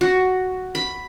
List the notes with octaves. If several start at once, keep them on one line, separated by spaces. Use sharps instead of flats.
F#4
B5